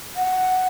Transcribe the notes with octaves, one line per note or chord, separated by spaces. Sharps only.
F#5